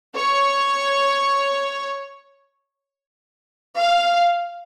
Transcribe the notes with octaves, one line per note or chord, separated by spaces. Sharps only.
C#5
F5